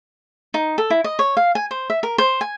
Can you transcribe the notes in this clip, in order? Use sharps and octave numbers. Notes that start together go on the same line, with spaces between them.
D#4
A4
E4
D#5
C#5
F5
G#5
C5
E5
A#4
C5
G#5